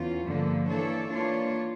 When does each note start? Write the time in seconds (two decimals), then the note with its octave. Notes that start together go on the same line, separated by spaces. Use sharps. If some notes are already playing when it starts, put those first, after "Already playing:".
Already playing: E2 C#4 F4
0.27 G2 D3 F3 A#3
0.68 E3 A#3 D4 A4 C#5
1.10 E3 A#3 D4 F4 C#5